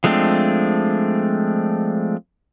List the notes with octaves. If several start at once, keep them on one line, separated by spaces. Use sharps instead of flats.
F3 G#3 A3 C4 D4